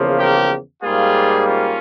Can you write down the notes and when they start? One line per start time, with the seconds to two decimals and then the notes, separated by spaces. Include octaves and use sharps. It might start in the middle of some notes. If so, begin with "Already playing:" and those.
Already playing: E2 C#3 F3 A#3
0.19 G4 A#4
0.82 G#2 G3 A#3 F4 G#4
1.44 C#4 F4